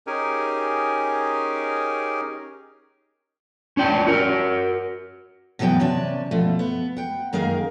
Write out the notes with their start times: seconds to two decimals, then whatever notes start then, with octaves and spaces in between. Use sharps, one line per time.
0.07 C#4 D#4 G4 G#4 A#4 G#5
3.77 C#4 D4 G5
4.07 F#4 A#4
5.59 B2 E3 F#3 B3 G5
5.80 C3 C#4 D5 A5
6.31 B2 F3 A3
6.59 B3
6.97 F#5 G5
7.33 F#2 D#3 A#3 G#4 A#4 F5